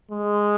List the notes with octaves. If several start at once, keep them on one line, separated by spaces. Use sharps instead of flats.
G#3